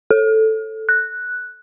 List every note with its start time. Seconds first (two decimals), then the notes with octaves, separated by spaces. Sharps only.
0.11 A4
0.89 F#6